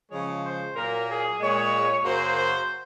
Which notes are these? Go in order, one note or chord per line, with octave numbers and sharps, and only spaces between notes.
C#3 F3 G#3 C#5
C5
A#2 F#3 A#3 A#4
G#4
A#2 G#3 C#5
F#2 C#3 F#3 A#3 C5
C5